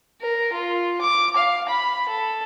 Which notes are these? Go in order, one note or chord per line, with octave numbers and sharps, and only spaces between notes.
A#4
F4
D6
F5
B5
A4